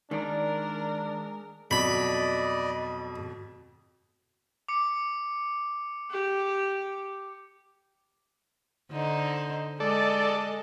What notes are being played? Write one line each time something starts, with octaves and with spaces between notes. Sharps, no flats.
D#3 G#3 D4 A#4 D5
F2 B2 F#3 D5 D#5 B5
D6 C#7
G4
D3 D#4 C5
G#3 A4 D5 D#5